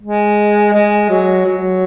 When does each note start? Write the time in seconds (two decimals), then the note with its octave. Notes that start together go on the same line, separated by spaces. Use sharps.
0.01 G#3
0.73 G#3
1.09 F#3
1.45 F#3